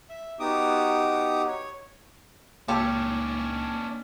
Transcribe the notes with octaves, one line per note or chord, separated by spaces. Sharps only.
E5
B3 D#4 F#4 G4 D6 D#6
C#5
C#2 A#2 A#3 C#4 D4 G4 A4